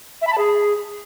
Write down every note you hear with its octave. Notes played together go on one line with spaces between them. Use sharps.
E5
B5
A5
G#4